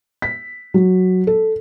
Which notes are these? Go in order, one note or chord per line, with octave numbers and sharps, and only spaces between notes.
B6
F#3
A4